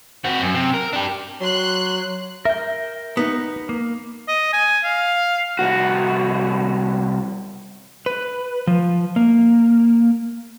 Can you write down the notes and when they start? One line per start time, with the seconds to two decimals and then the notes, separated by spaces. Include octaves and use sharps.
0.24 C4 F#4
0.42 F#2
0.55 C3
0.74 A#4
0.93 D4 G4
1.41 F#3 C6 F#6
2.45 A#4 E5 G5
3.17 B3 D#4
3.69 A#3
4.28 D#5
4.53 G#5
4.84 F5
5.59 C2 F#4
8.06 B4
8.67 F3
9.16 A#3